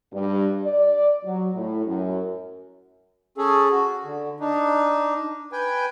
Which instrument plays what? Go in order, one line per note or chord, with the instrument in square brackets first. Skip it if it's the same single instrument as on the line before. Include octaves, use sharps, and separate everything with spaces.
[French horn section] G2
D5
F#3
A2
F#2
[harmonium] C#4 G#4 A4
F#4
D3
D4 D#4
B4 G5 G#5